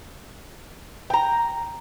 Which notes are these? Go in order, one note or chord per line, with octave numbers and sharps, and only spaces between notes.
G5 A#5